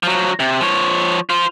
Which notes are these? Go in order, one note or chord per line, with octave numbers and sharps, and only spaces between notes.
F3 F#3
C3
F3 C#5
F4 C5